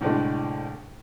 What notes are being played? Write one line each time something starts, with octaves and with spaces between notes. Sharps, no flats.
C2 A2 D3 G#3